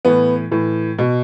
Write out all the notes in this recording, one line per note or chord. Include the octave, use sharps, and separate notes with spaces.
A2 E3 B3
A2 E3
B2